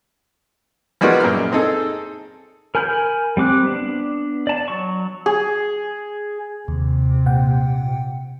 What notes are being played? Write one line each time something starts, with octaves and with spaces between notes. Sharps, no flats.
F3 G3 G#3 B3 F#4 A#4
F#2 A#2 F6
C4 D#4 G#4 A4
A#4 G#5 B5 G6
G3 C4 D6 F#6
B3 D4
D5 A5
F#3 C#6
G#4
D#2 C3
A#2 F#5 G5